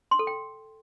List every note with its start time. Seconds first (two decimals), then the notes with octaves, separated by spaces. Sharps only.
0.11 C6
0.19 A4
0.27 G5